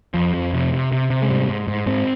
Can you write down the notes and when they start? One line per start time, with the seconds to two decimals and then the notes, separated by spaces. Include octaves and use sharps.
0.14 F2 F3
0.34 F2
0.53 C3
0.73 C3
0.92 C3
1.10 C3
1.22 G#3
1.29 G#2 G3
1.49 G#2
1.68 G#2
1.86 G#2 C4